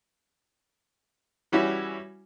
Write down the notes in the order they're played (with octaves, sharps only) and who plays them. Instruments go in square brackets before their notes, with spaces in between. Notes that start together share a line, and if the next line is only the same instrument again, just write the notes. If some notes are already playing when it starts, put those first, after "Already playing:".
[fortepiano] E3 G3 C#4 E4 F#4